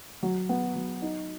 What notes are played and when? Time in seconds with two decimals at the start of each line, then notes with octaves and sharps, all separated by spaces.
0.23 F#3
0.49 B3
0.75 F#3
1.02 D#4